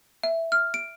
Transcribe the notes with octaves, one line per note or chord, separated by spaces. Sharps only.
E5
F6
D7